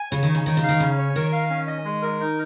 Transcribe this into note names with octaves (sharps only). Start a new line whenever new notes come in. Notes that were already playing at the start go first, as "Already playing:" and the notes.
Already playing: G#5
C#3 C#5
D#3
D#4
C#3
D#3 D#4
C#3
F5
D#3
C#3 C#4
C#5
D#3 A#4
F5
C#4
D#5
G#3
A#4
D#4